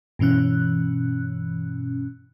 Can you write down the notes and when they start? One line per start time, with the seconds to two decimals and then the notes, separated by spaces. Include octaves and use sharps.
0.19 G2 B2 E3 C#4 F#6